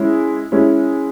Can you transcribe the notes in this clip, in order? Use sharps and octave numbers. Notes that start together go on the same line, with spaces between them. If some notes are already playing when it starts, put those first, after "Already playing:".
Already playing: G#3 C#4 E4
G#3 C#4 E4